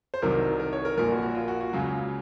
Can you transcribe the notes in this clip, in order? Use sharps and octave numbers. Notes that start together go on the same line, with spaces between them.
C5
C2 C3 D#3 F#3 A#4
A#4
C#5
A#4
A#1 A#2 F3 A#4
F#4
F#4
F4
F#4
F#4
C#2 C#3 F#3 F4